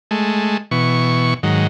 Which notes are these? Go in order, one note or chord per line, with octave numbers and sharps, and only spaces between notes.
G#3 A3
B2 E3 C#6
G#2 D#3 F#3